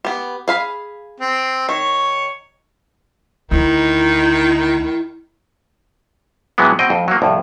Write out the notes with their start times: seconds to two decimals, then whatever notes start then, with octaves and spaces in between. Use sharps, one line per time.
0.05 B3 G4
0.48 G#4 F5 B5
1.20 C4
1.69 D#3 C#5
3.51 D2 D#3 D#4 E4
6.58 A2 E3 F#3 G#3 B3
6.79 B2 C4 D#5 G5
6.90 F2
7.08 F#3 A#3
7.22 C2 F2 A2